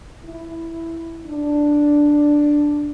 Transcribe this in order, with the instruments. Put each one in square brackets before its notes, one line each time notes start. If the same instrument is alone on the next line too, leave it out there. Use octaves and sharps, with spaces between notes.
[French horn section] E4
D4